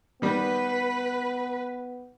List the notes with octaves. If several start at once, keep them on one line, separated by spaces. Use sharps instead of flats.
D#3 G3 B3 B4